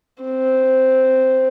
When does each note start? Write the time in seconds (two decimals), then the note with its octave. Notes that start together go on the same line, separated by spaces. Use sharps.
0.23 C4